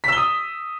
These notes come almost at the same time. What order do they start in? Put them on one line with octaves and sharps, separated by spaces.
B6 E6 G7 D#6